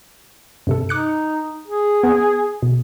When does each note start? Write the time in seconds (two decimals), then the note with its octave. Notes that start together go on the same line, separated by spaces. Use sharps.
0.67 G2 C3 A4
0.89 D#4 D6 F#6 C#7
1.67 G#4
2.03 B3
2.63 B2